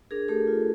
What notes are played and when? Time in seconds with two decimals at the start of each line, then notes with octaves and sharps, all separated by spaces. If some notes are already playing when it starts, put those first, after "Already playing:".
0.11 D4 G#4 A#4
0.28 A3 G4 A4
0.48 F4